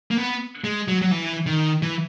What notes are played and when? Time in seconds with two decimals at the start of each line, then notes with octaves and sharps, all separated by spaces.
0.11 A#3
0.18 B3
0.64 G#3
0.88 F#3
1.02 F#3
1.11 E3
1.46 D#3
1.82 E3